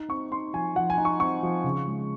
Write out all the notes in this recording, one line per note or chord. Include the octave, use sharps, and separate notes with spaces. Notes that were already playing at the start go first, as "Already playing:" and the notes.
Already playing: D#4
C4 C#6
D#4 C6
F3 G#5
F3 F#5
G#5
D#4
C#6
C4 C#6
F3
C#3
G#3